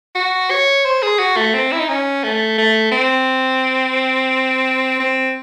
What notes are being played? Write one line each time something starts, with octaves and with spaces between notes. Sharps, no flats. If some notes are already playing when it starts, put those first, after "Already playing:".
F#4
C#5
C5
G#4
F#4
A3
C4
E4
D#4
C#4
A3
A3
C4
C4